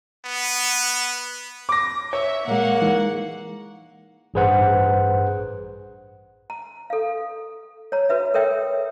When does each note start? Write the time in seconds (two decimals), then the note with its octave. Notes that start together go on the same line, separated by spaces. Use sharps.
0.25 B3
1.69 D6 A#6
2.13 C#5 E5
2.48 A#2 G#3 A#3 F#5
2.81 E3 G#3 D#4
4.34 A1 G2 G#4 B4 C5 F#5
6.50 A#5
6.90 A4 F5
7.92 C#5 A#5
8.09 F#4 B4 E5
8.34 A4 A#4 C#5 E5 G5